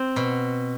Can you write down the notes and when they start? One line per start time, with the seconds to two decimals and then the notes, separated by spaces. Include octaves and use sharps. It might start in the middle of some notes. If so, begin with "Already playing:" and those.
Already playing: C4
0.16 B2